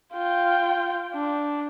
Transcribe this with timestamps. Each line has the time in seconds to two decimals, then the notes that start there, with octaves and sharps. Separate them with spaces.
0.13 F4 G5
1.14 D4